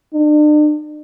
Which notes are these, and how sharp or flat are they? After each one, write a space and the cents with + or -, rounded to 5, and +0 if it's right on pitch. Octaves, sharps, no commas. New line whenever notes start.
D4 +40